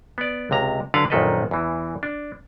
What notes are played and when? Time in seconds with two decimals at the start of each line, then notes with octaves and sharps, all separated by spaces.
0.18 B3 D5
0.51 C#2 C3 A#5
0.94 D3 F#3 D4 B4 F5 F#5
1.10 A#1 F#2 D#3 A4 B4 D#5
1.51 E2 E3
2.03 D4